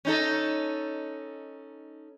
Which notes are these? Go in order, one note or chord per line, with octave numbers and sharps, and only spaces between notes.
C#4 D#4 A4